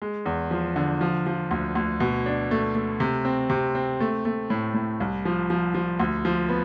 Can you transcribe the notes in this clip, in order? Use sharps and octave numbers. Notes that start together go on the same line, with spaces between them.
G#3
E2
F3
D3
F3
F3
D2
D2
B2
D4
A3
A3
C3
C4
C3
C4
A3
A3
A2
A2
C2
F3
F3
F3
D2
F3
B3